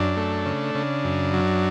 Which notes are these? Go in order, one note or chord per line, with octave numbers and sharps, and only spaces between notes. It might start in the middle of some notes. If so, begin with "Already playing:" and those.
Already playing: F#2 D4
A3
C#3
C#3
F#2
F#3